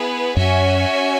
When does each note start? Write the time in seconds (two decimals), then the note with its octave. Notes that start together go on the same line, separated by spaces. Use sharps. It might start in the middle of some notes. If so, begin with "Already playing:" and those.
Already playing: B3 E4 G#4 B4
0.37 F#2 C#4 F#4 E5 G#5